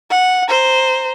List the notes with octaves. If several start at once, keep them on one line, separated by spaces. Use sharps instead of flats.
F#5
C5 A#5